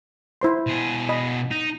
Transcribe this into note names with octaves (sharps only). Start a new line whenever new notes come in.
E4 C5 C6
B2 G#4
D#5 B5
D#4